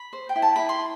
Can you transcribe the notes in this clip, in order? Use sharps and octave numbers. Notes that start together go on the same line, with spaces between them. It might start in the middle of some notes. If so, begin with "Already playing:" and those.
Already playing: B5
C5
G5
E4
A5
E4 B5
C6